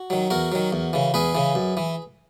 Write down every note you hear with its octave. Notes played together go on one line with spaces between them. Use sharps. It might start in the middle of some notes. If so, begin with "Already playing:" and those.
Already playing: F#4
D#3 F#3
E2 F#4 A#4
D#3 F#3
E2
C#3 E3
E2 G#4 B4
C#3 E3
F#2
E3